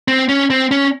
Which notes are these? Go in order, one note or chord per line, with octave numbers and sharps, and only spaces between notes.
C4
C#4
C4
C#4